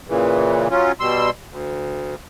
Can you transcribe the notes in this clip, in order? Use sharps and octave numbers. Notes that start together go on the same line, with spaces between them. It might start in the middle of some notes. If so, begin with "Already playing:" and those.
A#2 C#3 E3
F#3 C#4 F4
B2 G3 C6 E6
D2